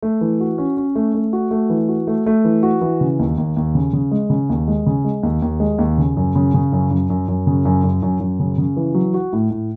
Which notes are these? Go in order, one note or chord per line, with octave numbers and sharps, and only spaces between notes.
A3
E3
F#4
C#4
C#4
A3
A3
F#4
A3
E3
F#4
A3
A3
E3
F#4
E3
C#3
D#2
D#2
D#2
C#3
C#3
G#3
C#3
D#2
G#3
C#3
G#3
D#2
D#2
G#3
D#2
C#3
F#2
C#3
C#3
F#2
F#2
F#2
F#2
C#3
F#2
F#2
F#2
F#2
C#3
C#3
E3
F#3
F#4
A2
A2